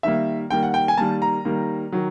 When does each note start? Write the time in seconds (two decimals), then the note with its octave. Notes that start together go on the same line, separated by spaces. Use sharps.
0.03 D#3 G3 A#3 E5
0.50 D#3 G3 A#3 G5
0.63 F#5
0.74 G5
0.88 G#5
0.98 D#3 G3 A#3 A5
1.22 A#5
1.45 D#3 G3 A#3
1.92 D#3 F#3